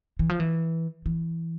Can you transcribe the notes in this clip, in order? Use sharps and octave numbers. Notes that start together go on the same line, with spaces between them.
E3
F3
E3
E3